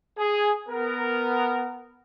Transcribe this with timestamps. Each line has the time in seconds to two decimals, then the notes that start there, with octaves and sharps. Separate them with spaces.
0.18 G#4
0.69 B3 A#4